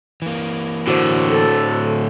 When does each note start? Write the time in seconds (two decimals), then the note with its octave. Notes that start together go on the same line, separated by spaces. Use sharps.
0.22 E3 A#3
0.87 A2 D3 F#4 C5
1.30 A4